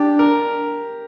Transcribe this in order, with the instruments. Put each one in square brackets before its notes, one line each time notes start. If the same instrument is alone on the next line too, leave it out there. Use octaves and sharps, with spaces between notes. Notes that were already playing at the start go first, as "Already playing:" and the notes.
Already playing: [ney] D4 [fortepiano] G4
[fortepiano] A#4